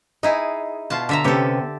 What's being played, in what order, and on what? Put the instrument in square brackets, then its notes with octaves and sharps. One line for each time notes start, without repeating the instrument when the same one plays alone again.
[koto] D#4 E4 G#4 [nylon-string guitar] D#5
[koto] B2 F4 A5
D3 E5 A#5
[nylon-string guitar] C3 B3 C#4 [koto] G4 A4